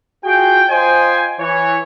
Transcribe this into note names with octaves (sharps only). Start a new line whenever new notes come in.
F4 F#4 G#4 G5
F4 C5 D#5 G5 G#5
E3 C#5